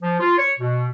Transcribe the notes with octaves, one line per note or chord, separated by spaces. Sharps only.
F3
F4
C#5
B2